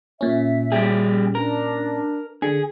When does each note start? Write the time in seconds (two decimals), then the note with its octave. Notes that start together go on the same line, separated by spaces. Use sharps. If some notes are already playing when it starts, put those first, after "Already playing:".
0.21 A#2 C#4 E5
0.72 G3 G4 G#4
1.35 D4 A#4
2.42 D3 G#4